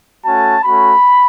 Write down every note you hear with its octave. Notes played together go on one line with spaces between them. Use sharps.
A3 C#4 F#4 A5
A3 C#4 F#4 B5